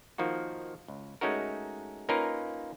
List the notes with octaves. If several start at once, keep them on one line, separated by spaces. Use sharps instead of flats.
D#3 F3 A#3 D#4 F#4
C#2
G#3 A3 C#4 D#4 F#4 A#4
A#3 C#4 D#4 F4 A#4 B4